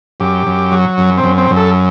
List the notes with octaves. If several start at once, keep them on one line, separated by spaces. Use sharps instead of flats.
F#2 G4
F#2
F#3
F#2
C4
F#2
C4
F#2
A4